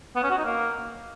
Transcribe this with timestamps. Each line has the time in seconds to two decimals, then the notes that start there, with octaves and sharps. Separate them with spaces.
0.16 B3
0.23 C#4
0.30 F#4
0.37 D#4
0.45 A#3